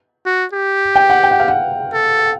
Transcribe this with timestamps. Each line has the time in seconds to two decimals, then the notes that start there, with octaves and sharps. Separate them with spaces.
0.25 F#4
0.53 G4
0.96 G5
1.10 F#5
1.24 G5
1.31 F#5
1.40 F5
1.48 F#5
1.93 A4